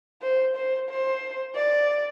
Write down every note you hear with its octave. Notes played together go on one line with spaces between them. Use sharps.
C5
C5
C5
D5